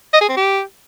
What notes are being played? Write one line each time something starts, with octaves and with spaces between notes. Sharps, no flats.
D#5
G#4
C4
G4